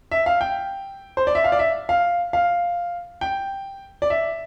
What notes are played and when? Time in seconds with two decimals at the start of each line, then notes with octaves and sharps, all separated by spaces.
0.11 E5
0.26 F5
0.41 G5
1.17 C5
1.27 D5
1.35 E5
1.44 F5
1.52 D5
1.59 E5
1.89 F5
2.33 F5
3.21 G5
4.02 D5
4.10 E5